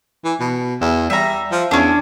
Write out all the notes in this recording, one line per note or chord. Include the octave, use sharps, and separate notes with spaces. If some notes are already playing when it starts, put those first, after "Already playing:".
E3
B2
E2
G3 E5 A#5
F3
E2 C#4 D4